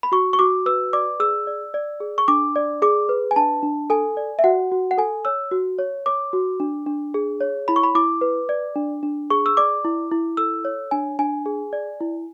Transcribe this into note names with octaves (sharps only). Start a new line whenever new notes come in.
B5
F#4 C#6
C#6
F#4 D6
B4 E6
D5 D6
G#4 E6
D5
D5
G#4
C#6
D4 D6
D5
G#4 D6
B4
G#5
D4 A5
D4
A4 G#5
D5
E5
F#4 F#5
F#4
F#5
A4 G#5
C#5 E6
F#4
C#5
C#5 D6
F#4
D4
D4
G#4
C#5
E4 B5
C#6
B5
E4 D6
B4
D5
D4
D4
G#4 C#6
E6
D5 D6
E4
E4
A4 E6
C#5
D4 G#5
D4 G#5
G#4
D5
E4